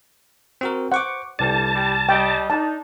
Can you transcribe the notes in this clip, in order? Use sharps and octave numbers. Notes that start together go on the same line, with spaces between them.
C4 F#4 A#4
C5 F#5 C#6 D6
C2 D3 E3 G3 D5 A5
G3
G3 D#5 G5
D4 D#4 A5